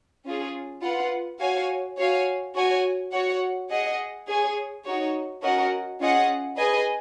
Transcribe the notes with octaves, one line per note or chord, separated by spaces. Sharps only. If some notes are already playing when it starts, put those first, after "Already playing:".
C#4 F4 G#4
F4 B4 F#5
F#4 C#5 F5 G#5
F#4 C#5 F5 G#5
F#4 C#5 G#5
F#4 C#5 F#5
G#4 D#5 F#5
G#4 C#5 G#5
D#4 F#4 C#5
C#4 F#4 A#4 D#5 F#5
C#4 F4 G#4 D#5 F#5
G#4 B4 D#5 G#5